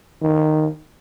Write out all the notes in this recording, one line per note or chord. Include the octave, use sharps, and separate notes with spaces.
D#3